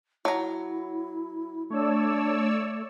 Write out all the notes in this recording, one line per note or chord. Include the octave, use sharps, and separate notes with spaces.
F#3 E4 A#5
A3 D4 C#5 D5 E6